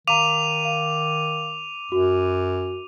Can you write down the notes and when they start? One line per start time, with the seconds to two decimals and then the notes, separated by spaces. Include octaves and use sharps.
0.07 D#3 F5 A#5 D6 D#7 F7
0.65 F5
1.92 F#2 F#4